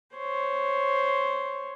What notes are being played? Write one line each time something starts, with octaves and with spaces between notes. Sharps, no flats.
C5 C#5